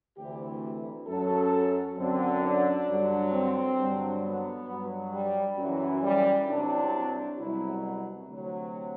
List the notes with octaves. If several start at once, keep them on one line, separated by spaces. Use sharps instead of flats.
D2 C3 E3 G4
F#2 F#3 A4
F#2 D3 F#3 C4
D4
G2 D3 F#3
C4
G2 D3 F#3
B3
G2 F#3
G3
F#2 E3 F#3
G3
C2 C3 F#3 D4
C2 B2 F#3 E4
D2 C3 F#3